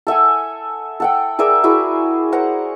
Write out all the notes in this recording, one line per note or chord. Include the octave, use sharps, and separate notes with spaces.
A4 E5 F#5 G#5
A4 F#5 G5
G#4 A#4 D5 E5
E4 F#4 G#4 E5
A#4 C5 F#5 A#5